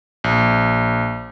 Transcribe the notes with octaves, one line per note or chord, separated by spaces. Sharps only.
A#1